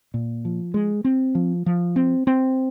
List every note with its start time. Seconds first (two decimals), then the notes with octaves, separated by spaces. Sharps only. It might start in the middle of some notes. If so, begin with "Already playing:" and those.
0.14 A#2
0.45 F3
0.74 G#3
1.04 C4
1.35 F3
1.66 F3
1.96 C4
2.27 C4